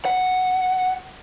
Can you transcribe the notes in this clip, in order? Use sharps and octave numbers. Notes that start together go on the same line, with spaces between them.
F#5